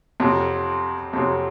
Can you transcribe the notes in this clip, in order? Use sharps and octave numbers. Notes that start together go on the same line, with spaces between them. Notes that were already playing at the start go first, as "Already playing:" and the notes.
F2 C3 F#3
F2 C3 F#3